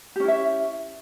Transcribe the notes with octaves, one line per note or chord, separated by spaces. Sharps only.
C#4 E4 G4 E5